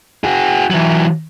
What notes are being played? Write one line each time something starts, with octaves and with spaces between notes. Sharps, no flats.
F#4 G#4
E3 F#3